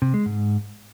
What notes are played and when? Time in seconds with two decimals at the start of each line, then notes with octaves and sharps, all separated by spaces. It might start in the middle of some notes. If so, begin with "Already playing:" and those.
0.02 C3
0.14 G#3
0.26 G#2